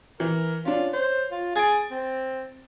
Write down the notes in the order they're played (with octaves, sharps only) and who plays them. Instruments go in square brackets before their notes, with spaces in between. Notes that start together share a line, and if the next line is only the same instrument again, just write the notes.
[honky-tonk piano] E3 [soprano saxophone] A#4
[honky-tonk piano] C#4 D4 [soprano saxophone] F4
[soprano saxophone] C5 [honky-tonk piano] C#5
[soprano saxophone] F4
[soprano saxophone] G#4 [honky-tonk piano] A6 D7
[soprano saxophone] C4